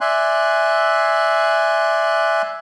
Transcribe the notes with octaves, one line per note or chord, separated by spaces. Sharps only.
D5 E5 G#5 C6 F#6